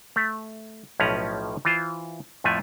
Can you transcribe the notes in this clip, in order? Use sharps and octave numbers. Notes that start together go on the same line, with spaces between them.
A3
B1 A2 F3 C#4 B4 A#5
E3 F4 C5
F2 A2 F3 A3 G#5